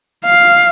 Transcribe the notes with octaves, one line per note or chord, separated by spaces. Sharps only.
F5